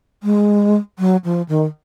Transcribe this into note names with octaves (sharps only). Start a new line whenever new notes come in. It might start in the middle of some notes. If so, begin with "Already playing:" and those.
G#3
F#3
F3
D#3